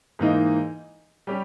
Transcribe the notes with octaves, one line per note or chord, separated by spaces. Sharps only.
G#2 E3 A#3 D#4
G3 C#4 G4